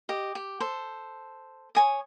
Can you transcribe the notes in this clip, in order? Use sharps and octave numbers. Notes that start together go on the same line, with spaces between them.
G4 D#5
G4
A4 C5
C#5 G#5 D#6